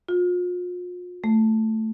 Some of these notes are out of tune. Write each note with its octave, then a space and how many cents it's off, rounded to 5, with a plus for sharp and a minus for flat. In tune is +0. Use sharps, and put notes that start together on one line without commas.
F4 +40
A3 +5